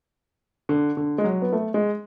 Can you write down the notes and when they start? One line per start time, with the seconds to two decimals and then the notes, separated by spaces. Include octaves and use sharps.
0.69 D3
0.97 D3
1.18 G#3
1.24 F#3
1.42 B3
1.52 A3
1.74 G#3